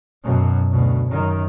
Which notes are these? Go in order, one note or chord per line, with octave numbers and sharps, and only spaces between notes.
F#2 B2
D2 B2
F#2 D#3